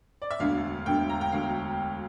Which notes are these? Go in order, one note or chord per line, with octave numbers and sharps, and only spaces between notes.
D5
E5
E1 D2 D3 F5
E1 D2 D3 G5
A#5
G5
E1 D2 D3 F5